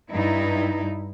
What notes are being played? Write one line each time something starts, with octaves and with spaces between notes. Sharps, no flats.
G2 D#4 E4